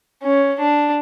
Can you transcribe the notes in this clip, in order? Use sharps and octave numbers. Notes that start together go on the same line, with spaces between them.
C#4
D4